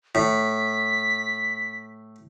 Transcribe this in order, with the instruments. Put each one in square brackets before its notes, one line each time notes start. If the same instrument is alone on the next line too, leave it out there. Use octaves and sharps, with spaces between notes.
[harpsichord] A2 [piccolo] B6